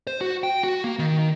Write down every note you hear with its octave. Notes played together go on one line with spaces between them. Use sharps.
C5
F#4
G5
F#4
A#3
D#3